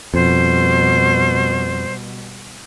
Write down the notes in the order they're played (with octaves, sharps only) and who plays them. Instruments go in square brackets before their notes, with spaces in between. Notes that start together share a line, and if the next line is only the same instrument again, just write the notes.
[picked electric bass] F2 [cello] B2 G3 [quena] C5